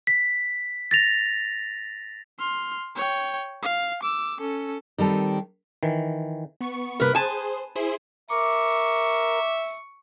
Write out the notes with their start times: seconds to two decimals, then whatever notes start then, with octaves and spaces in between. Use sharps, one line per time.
0.07 B6
0.91 A6 A#6 F7
2.39 C6 F6
2.96 C#5 G5
3.63 F5
4.03 D6 E6
4.40 C#4 A4
4.98 D#3 G3 C4 A4
5.83 D#3 E3
6.61 B3 C#6
7.00 G2 C3 A#3 A#4 B4
7.15 G#4 C5 G#5 A5
7.75 E4 G#4 C5
8.30 A#4 E5 C#6 D6